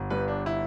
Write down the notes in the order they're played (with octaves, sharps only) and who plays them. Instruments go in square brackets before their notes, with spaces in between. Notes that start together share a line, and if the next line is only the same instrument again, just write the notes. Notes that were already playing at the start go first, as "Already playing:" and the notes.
Already playing: [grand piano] G1
[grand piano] G2 [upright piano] B4
[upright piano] D4
E4